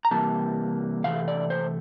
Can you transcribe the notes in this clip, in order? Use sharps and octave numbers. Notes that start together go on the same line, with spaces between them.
A#5
C3 E3 G3 A#3 A5
C3 E3 A3 F5
D5
C5